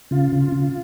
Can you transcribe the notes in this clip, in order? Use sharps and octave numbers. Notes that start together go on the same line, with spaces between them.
C#3 F4
C#3
C#3